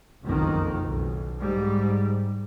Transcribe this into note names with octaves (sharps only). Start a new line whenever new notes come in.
F#1 B1 F2 D#3
B1
G#2 G3